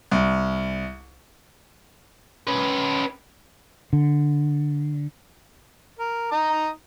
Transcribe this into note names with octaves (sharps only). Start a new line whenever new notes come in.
C2
C#4 B4
D3
A#4
D#4 A#5 D#6